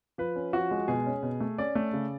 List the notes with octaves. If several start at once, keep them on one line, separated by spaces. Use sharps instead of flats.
F3 B4
C#4
F3 F#4
G#3
B2 G#4
C#4
B2
A3
C#4 D5
A3
C#3